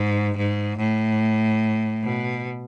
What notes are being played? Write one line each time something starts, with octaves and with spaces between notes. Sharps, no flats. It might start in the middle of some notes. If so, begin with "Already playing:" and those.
Already playing: G#2
G#2
A2
B2